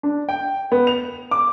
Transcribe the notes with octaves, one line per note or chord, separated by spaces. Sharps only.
D4
G5
B3
F7
D6